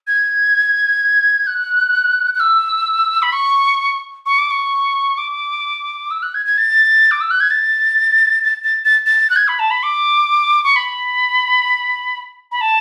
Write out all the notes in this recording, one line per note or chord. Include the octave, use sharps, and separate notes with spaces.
G#6
F#6
F#6
E6
B5
C#6
C#6
D6
C#6
D6
E6
F#6
G#6
G#6
A6
D6
E6
F#6
G#6
A6
A6
A6
A6
A6
F#6
G#6
B5
A5
B5
D6
C#6
B5
B5
A5